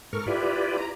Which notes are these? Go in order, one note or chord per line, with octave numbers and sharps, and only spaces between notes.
G#2 A4 A#4 C#6 F6
E4 F4 G4 B4 D5
A#5